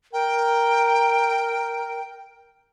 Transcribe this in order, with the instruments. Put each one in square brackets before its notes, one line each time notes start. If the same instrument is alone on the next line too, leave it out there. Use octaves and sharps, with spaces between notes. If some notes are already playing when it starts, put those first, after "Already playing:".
[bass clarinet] A#4 [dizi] G5